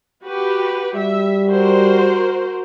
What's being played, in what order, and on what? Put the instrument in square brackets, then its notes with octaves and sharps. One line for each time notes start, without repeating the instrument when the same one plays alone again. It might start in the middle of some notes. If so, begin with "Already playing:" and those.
[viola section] F#4 G4 B4
[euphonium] G3 [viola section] E5
[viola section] F#4 A#4 C5